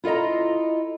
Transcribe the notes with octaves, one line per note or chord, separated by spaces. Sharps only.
E4 F4 A4 D#5 A#5